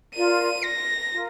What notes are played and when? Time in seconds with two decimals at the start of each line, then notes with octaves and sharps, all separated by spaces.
0.14 F4 A#4 D5 D#7
0.64 A#6
1.13 F4 A#4